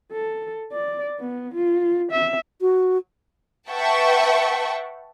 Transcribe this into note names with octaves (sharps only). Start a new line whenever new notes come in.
A4
D5
B3
F4
E5
F#4
B4 E5 F#5 G5 A5 C#6